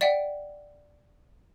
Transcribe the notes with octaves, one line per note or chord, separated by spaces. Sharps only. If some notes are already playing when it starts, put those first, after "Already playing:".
D5 E5 F#5 G5